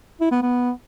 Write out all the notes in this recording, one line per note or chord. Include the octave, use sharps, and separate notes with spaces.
E4
B3
B3